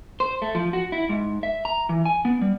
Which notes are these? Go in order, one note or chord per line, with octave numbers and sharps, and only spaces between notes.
C5
A3
F3
F#4
E4
G#2
E5
A#5
E3
G#5
B3
G3